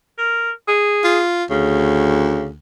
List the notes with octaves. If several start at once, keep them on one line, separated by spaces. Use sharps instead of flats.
A#4
G#4
F4
D2 C#3